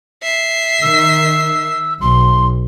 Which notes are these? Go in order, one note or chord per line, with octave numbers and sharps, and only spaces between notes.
E5 C7
D#3 E6
B1 C6